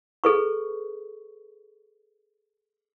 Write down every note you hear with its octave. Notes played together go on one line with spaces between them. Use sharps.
G#4 A4 B4 C#6